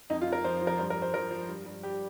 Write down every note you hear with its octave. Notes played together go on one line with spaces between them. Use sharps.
F2 D#4
F4
F2
A#4
F3 C5
F3
A#4
G2 C5
A#4
G2
C5
F3 A#4
F3
G2
G2
G3 G4